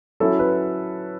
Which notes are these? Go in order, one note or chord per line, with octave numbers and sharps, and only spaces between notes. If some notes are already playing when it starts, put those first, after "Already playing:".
F#3 C#4 E4 A4
B4